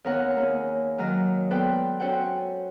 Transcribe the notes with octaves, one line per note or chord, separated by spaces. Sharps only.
D#2 B3 C#4 A#4 C#5 F#5
A#3 C#4 G#4
D#3 F#3 G#3 A#4 D#5
B3 A4 B4 C5 D5 G5
C#4 F#4 A4 C5 F#5 G5